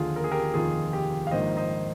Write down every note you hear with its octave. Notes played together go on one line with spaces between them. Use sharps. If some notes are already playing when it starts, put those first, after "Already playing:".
Already playing: D#2 D3 F3 F4 G#4
A#4
G#4
G4 A#4
F1 D#2 D#3 F4 G#4
G4
F5
A#1 G#2 D#3 A#3 C5 D#5
C5 D#5